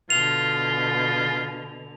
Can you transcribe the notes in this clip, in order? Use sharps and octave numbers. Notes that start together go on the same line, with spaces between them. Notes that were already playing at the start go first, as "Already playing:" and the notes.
B2 D3 F4 F7